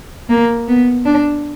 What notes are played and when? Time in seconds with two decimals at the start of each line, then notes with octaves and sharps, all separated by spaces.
0.29 A#3
0.68 B3
1.05 D4